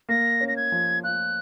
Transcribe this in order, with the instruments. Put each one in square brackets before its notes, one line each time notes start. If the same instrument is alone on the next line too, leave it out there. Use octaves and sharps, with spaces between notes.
[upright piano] A#3 [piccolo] A#6
[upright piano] C#4
[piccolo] A#6
G#6
[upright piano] F3
[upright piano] F4 [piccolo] F#6